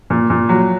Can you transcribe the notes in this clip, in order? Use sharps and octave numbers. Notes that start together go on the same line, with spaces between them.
A#2
A#2
F#3